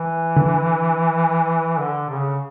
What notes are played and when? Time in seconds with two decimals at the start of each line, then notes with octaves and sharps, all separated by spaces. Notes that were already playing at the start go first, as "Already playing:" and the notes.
Already playing: E3
0.37 D3
1.78 D3
2.10 C#3